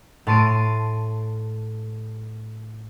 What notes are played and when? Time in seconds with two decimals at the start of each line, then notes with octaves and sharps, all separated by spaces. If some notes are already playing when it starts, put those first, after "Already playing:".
0.27 A2 A5 C6 D7 D#7